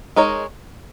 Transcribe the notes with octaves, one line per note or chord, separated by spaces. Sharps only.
G#3 D#4 A#4 C#5